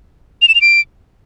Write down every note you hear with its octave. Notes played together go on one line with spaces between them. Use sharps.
F7
E7
F7
D7